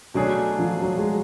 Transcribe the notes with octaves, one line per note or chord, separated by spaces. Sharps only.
B2 F#3 A3 D4 G#4 C#5
F3
F#3
G#3